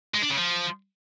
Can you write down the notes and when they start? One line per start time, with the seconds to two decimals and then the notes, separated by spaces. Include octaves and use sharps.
0.15 G#3
0.22 D4
0.30 C#3
0.38 F3